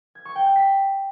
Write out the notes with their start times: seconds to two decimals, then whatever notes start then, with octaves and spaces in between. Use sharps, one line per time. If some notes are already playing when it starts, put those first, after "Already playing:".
0.15 G#6
0.25 C#6
0.35 G5
0.46 G6
0.56 B6